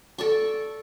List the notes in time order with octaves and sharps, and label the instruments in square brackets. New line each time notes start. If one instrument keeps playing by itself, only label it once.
[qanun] A4 D5 C#6